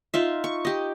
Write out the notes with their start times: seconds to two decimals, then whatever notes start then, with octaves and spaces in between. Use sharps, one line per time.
0.14 D#4 F4 E5
0.44 C#6
0.65 G4 D#5